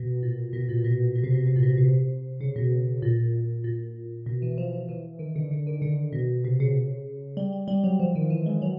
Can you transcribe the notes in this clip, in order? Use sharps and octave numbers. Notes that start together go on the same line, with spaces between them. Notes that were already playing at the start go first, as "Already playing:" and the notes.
Already playing: B2
A#2
B2
A#2
B2
B2
C3
B2
C3
A#2
B2
C3
C#3
B2
A#2
A#2
B2
E3
F3
F3
E3
D#3
D3
D3
D#3
D3
B2
C3
C#3
G3
G3
G3
F#3
F3
D#3
E3
G#3
F#3